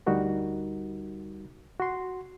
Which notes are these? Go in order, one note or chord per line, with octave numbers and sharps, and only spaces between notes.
D2 G3 D#4 F#4 A#4
F#4 C6